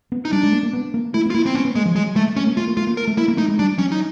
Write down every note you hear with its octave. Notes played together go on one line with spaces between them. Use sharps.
B3
D#4
G3 D4
G#3
A#3
A#3
B3
A#3
A3 E4
B3
F4
A#3 E4
C4
B3 C#4
B3
G#3 A#3
F3
F#3 G#3
G#3 A3
A3 C#4
A#3
A3 F4
A#3
A3 F4
A#3
A#4
A3
A#3 E4
A#3
A3 D#4
G#3
G3 D4
F#3 C#4
D#4